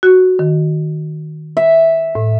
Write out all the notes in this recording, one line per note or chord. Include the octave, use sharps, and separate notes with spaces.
F#4
D#3
E5
A2